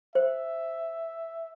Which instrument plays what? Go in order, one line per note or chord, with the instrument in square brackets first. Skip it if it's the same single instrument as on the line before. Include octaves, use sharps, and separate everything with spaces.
[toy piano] C5 [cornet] E5